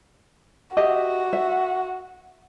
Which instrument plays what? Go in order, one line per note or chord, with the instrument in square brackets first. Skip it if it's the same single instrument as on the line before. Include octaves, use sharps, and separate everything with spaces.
[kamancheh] F#4 [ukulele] G4 D#5 E5
[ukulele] E5